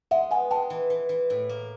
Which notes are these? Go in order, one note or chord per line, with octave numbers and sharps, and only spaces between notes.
G#3 E5 F#5
B3 F#5 G#5
G#3 G5 A5
E3
E3
E3
A2
A#3